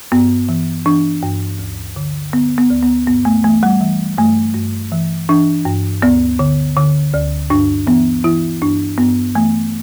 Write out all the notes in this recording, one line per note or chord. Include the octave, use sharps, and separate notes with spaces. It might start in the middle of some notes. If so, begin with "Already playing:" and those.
G2 B3
E3
E3 D4
G2
D2
D3
D3 B3
B3
D2
B3
G2 B3
A3
E3 A3
G3
E3
G2 A3
G2
E3
E3 D4
G2
D2 B3
D3
D3
D2
G2 D4
E3 B3
E3 E4
G2 D4
G2 B3
E3 A3